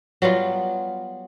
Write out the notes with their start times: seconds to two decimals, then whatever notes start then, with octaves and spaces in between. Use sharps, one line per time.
0.22 F#3 G3 B3 F4